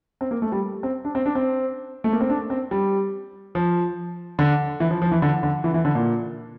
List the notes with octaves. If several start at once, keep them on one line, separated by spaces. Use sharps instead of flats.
C4
A#3
A3
G3
C4
D4
C4
D4
C4
A3
A#3
C4
D4
C4
G3
F3
D3
E3
F3
F3
E3
D3
D3
E3
E3
D3
A#2